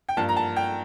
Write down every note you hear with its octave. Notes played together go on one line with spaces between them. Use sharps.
G5
G2 F3 A#3 A5
A#5
A5
G5